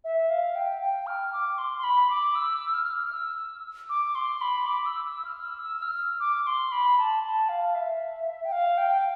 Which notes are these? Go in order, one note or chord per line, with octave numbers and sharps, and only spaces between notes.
E5
F5
G5
G5
F6
D6
C6
C6
B5
D6
E6
F6
E6
D6
C6
B5
D6
E6
E6
F6
E6
E6
F6
D6
C6
B5
A5
A5
F5
E5
G5
F5
G5